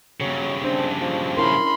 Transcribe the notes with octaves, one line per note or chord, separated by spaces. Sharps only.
G2 C#3 F#3
C4 D4
F3
C#4 E4 A#4 B5 C6